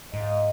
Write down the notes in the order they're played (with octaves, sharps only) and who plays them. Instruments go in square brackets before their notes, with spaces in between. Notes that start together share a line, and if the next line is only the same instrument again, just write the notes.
[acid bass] G#2 [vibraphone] D#5
[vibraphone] F5
D#5